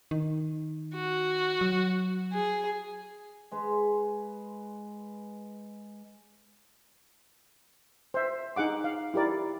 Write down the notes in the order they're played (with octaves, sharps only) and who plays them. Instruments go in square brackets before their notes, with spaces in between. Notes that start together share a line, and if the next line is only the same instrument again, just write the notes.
[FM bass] D#3
[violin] F#4
[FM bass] F#3
[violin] G#4
[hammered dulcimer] G#3 B4
[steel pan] C5 E5
D#4 G#4 F#5 D6
F5
E4 G4 A#4 D5